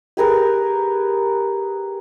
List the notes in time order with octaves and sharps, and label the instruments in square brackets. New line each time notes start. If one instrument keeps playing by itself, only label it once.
[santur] G4 G#4 A#4 B4